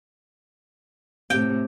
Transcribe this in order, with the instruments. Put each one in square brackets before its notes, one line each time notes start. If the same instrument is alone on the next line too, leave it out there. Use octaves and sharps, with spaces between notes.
[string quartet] A2 C3 [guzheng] G5